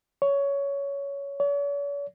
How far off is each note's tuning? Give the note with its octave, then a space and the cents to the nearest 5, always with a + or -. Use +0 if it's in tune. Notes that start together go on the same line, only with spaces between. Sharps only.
C#5 +15
C#5 +45